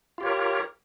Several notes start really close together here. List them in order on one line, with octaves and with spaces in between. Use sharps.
F4 G4 C#5 A#4